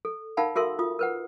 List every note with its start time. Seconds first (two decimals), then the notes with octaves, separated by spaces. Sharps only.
0.05 A4
0.37 D#4 A#4 F5 F#5 A5 B5
0.56 F#4 A4 A#4 E5 C6 E6
0.79 F4 D#6
0.99 A#4 B4 F#5